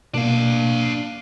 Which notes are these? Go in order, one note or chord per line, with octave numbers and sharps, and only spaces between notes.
B2 A#3 D4 F5